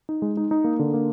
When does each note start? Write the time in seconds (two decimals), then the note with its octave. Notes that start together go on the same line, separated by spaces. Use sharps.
0.09 D#4
0.22 G#3
0.37 D#4
0.51 D#4
0.64 A#3
0.79 D3
0.94 A#3